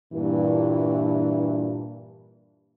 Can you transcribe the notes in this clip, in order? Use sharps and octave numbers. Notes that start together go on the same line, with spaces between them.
G2 A#2 E3